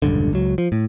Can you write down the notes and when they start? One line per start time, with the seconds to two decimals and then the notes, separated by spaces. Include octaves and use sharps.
0.02 E1 C#2 G2 D3
0.33 C#2 F#3
0.58 F3
0.72 A2